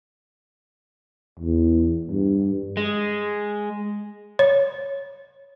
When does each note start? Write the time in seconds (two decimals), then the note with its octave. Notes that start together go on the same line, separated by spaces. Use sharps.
1.39 E2
2.11 G2
2.77 G#3
4.39 C#5